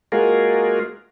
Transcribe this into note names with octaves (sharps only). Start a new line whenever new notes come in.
G#3 A#3 F4 F#4 G#4 A#4